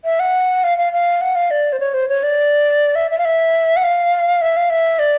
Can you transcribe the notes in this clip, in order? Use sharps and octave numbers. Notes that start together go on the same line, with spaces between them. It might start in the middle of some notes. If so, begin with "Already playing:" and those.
E5
F#5
F5
F5
F5
F#5
F5
D5
C5
C#5
C5
C#5
D5
E5
E5
F5
E5
F#5
F5
E5
F5
E5
D5